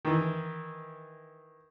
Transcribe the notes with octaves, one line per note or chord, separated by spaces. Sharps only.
D#3 E3